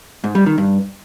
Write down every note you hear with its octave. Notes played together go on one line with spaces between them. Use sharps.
G#2
G3
D#3
G2